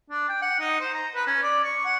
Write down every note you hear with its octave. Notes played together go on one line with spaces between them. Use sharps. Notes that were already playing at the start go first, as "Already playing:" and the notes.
D4
G5
F#5
D#4
C5
A#5
B4
C#4
D5
C#6
F#5